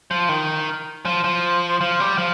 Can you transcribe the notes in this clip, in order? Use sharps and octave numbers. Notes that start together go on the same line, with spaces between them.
F3
D#3
F3
F3
F3
G3
F3